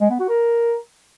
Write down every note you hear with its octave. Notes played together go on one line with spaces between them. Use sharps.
G#3
B3
F#4
A#4